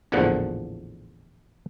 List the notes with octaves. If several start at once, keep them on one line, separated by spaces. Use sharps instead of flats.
A1 E2 A#2 D3 F3 F#5